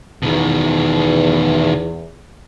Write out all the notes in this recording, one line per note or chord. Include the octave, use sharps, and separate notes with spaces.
E2 B2 D#3